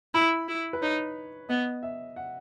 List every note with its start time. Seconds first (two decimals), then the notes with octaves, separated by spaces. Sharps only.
0.14 E4 B5
0.48 E4
0.73 B4
0.81 D#4 C#5
1.49 B3 D#5
1.83 E5
2.16 F#5